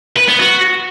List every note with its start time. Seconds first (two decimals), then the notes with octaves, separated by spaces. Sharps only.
0.17 B4
0.29 B3
0.40 F#4